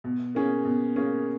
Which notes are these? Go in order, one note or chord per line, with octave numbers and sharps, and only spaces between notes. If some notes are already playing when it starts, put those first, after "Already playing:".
B2
A#3 C#4 G#4
B2
A#3 C#4 G#4